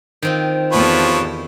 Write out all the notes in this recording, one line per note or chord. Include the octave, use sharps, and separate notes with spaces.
D#3 C4 F4
E2 C3 F3 A4 B4 C#5